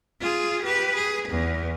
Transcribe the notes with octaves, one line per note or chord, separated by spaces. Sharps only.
F4 G#4
G4 B4
G#4
E2